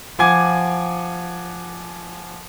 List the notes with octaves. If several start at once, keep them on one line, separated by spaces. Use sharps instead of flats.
F3 F#5 G#5 D6 G#6